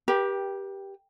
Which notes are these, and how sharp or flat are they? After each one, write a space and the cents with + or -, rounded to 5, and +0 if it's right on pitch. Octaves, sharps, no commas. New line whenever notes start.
G4 +5 B4 -45 G5 +0